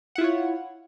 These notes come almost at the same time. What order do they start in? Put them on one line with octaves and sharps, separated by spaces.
F#5 E4 F4 C#5